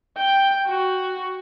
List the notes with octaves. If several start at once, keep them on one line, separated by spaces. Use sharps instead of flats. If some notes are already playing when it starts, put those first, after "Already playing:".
G5
F#4